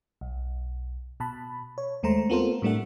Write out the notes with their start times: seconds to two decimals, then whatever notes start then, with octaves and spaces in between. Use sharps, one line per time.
0.21 B1
1.20 B2 A5 B5
1.78 C#5
2.03 D#2 G#3 A3 C5 A#5
2.30 B3 C4 F4 A4 A#4 C5
2.62 A2 G3 A3 D4 F#5